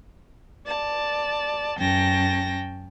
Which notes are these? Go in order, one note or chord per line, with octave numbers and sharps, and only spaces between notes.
D5 A5
F#2 C#4 G5 A5 A#6